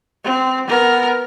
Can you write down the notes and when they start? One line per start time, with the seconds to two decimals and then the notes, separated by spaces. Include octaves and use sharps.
0.24 C4
0.67 B3 A#4